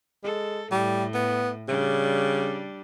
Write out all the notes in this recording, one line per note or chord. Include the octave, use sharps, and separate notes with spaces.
G#3 A4
A2 G3
B3
C#3 G3 D4